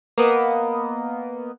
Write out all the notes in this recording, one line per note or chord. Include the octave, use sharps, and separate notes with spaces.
A#3 B3 A#4 D#5